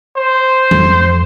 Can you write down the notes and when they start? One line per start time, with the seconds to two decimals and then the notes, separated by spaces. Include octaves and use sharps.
0.17 C5
0.71 F2